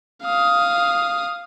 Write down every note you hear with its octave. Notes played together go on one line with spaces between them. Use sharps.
F5 D#6